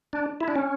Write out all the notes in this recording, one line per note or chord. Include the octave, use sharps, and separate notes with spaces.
D4
E4
D4
C#4